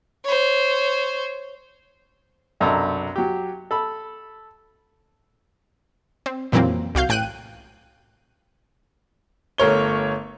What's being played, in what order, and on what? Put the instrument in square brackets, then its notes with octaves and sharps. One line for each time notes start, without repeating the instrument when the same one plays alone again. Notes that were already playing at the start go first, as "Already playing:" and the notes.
[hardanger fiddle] C5 C#5
[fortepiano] B1 F#2 C3 D4 A4 A#5
F#3 G4
A4 B5
[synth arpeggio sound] C4
F2 A#2 E3 F#3 A#3 C4
C2 F#4 F5 G6
A1 G5 F#6 D#7
[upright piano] G1 A3 A#4 C#5 G7